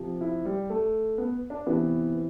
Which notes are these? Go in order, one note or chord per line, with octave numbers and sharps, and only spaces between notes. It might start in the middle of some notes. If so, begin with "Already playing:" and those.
Already playing: C3 F3
E4
G3
A3
B3
D4
C3 E3 B3